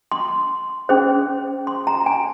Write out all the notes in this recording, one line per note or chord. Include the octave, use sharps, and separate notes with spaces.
C6
C#4 G#4 C5
C6
A#5
G#5